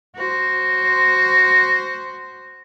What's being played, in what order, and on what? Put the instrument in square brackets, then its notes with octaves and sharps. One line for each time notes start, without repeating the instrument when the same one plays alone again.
[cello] F#4 C5